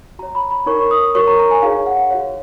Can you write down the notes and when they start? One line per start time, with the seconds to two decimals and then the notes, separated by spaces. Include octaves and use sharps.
0.19 F#4 C#5 A#5
0.35 B5
0.51 B5
0.66 D#4 A#4 C#5 C#6
0.91 D#6
1.15 F#4 A#4 C#5 C#6
1.27 A#5
1.39 A#5
1.51 G#5
1.62 D#4 G#4 C#5 F5
1.86 F#5
2.11 F#4 C#5 F5